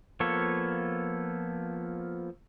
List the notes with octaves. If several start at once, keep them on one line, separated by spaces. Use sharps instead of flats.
F3 A#3 B3 A4 C#5